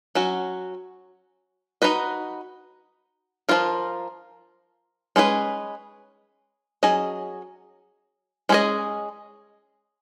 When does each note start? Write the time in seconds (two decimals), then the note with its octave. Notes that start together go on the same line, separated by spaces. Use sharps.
0.15 F#3 C#4 F#4
1.82 D#4 F#4 B4 D#5
3.49 F3 A#3 F4 A#4
5.16 G#3 C#4 G#4 B4
6.83 F#3 C#4 G#4 D#5
8.49 G#3 C#4 G#4 D#5